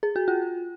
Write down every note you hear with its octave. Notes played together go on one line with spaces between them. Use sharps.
G#4
F#4
F4